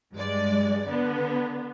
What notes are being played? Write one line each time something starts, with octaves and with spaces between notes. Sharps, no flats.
G2 G#3 D5
D3 B3